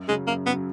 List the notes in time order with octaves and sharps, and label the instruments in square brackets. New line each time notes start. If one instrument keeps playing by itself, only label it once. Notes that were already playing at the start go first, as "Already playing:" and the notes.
Already playing: [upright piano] F#2
[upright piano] C#3 F#3 [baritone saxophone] G#3
[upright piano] F#2 [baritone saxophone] A#3
[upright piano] C#3 [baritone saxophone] B3
[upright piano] F#3